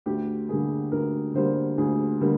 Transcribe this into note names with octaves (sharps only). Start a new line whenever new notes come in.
D2 G4
D3 G3 A#3 G#4
D2 A#4
D3 G3 A#3 C5
D2 G#4
D3 G3 A#3